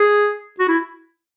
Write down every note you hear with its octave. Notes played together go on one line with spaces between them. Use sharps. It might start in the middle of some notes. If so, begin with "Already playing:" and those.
Already playing: G#4
F#4
E4